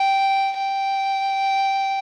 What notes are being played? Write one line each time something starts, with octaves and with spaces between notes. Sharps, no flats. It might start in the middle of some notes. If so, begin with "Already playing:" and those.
Already playing: G5
G5